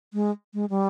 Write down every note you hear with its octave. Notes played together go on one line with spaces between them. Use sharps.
G#3
G#3
G3